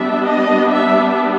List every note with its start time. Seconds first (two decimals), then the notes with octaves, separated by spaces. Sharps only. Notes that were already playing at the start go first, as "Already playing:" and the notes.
Already playing: G3 B3 D4 E5
0.25 D#5
0.69 E5